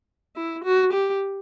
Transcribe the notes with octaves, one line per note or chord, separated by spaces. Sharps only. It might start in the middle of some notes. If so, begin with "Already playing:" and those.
E4
F#4
G4